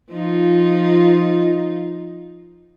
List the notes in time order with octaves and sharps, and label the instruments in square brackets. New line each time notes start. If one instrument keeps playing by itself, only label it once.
[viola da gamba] F3 D#4 F4